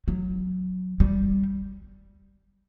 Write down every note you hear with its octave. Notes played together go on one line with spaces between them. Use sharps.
F#3
G3